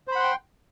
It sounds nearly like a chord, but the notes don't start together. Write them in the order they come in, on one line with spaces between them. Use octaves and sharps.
C5 B5 F#5 C6 G5